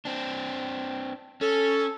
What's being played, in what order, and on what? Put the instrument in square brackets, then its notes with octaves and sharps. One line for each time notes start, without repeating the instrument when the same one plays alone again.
[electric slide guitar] C4 D4
[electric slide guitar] C#4 [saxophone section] A4